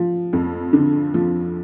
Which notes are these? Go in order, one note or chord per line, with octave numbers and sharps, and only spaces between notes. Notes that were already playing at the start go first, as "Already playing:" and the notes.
Already playing: F3
F2
D3
F3